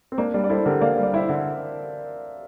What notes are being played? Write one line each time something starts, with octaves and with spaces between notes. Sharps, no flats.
C4
A#3 D4
G3 D4
D5
E4 A4 C5
D3 G4 A#4
A#3 D5 F5
G3
D5
E4 C5 E5
D3